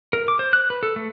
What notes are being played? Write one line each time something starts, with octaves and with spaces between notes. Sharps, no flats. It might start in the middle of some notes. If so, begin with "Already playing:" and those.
A#4
D6
C5
F#6
B4
A4
A3